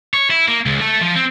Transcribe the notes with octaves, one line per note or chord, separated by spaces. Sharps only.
C#5
E4
A#3
C#2
A3
F3
C4